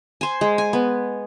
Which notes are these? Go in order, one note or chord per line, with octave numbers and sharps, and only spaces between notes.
C5 G#5
G#3
G#5
B3